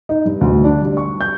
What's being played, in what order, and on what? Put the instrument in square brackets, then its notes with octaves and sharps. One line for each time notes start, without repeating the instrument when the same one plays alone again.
[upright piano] D#4
G2
D2
D4
G3
C#6
G6